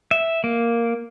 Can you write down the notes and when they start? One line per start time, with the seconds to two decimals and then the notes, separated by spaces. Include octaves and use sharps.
0.11 E5
0.44 A#3